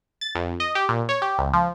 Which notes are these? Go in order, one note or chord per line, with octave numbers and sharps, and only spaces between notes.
A6
F2
D#5
G4
A#2
C#5
G4
C#2
F3